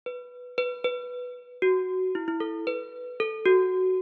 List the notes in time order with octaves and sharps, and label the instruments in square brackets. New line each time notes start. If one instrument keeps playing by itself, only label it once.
[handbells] B4
B4
B4
F#4
E4
E4
A4
B4
A4
F#4